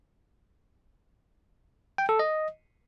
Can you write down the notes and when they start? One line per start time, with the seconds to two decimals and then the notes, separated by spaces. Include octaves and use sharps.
1.98 G5
2.09 A4
2.19 D#5